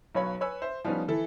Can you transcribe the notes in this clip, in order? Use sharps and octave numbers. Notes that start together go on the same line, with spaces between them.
B1 F#3 B4 C#5 F5 B5
B4 C#5 G#5 B5 E6
C5 E5
F3 G3 B3 C#4 D#4
E3 E4 A4